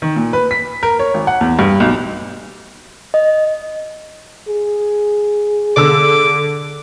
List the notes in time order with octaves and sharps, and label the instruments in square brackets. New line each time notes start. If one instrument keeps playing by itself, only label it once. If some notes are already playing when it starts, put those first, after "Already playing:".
[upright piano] D#3
A#2
B4
B6
A#4
C#5
G#1
F#5
E2
G2
B1
[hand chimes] D#5
[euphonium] G#4
[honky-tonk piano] D3 E6 [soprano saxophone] D6